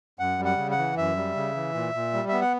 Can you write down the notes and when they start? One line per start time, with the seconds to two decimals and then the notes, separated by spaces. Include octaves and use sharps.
0.19 F#2 F#5
0.39 G3
0.45 F#5
0.58 C#3
0.71 F#5
0.78 E3
0.97 F#2 E5
1.17 G3
1.36 C#3
1.56 E3
1.74 A#2
1.94 A#2
2.13 G3
2.29 B3 E5
2.41 F#5